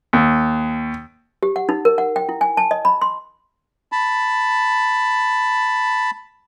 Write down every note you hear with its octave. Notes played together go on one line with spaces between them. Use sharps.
D#2
G4
F#5
D#4
A#4
F#5
G5
E4
G#5
A5
D#5
B5
C6
A5 B5